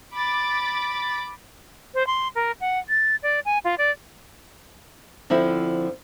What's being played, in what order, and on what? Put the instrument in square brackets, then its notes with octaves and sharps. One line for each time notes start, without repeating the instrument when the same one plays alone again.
[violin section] B5 D6 A6
[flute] C5
C6
A#4
F#5
A6
D5
G#5
F4
D5
[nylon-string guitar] D3 F3 C4 E4